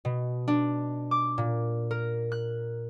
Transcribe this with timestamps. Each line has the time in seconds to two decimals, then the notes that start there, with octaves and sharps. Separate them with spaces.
0.05 B2
0.48 D4
1.11 D6
1.38 A#2
1.91 A#4
2.32 F#6